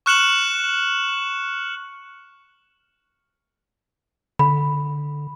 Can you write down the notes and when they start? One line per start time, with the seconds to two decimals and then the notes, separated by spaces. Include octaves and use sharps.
0.06 C#6 F6 F#6 C#7 E7 F#7
4.39 D3 B5